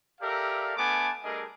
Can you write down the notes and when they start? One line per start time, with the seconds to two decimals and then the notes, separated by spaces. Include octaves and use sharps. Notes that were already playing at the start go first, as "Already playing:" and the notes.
0.21 G4 A4 A#4 D5 E5 F5
0.77 A3 B3 D4 G#5 A5 D6
1.23 G3 A3 D4 G#4 A#4 D#5